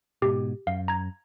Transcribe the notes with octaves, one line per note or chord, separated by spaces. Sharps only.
G#2 B2 G4
F#2 F5
A#5 G#6